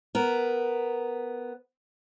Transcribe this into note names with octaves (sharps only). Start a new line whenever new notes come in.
B3 A#4